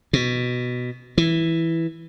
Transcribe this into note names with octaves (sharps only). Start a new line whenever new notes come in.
B2
E3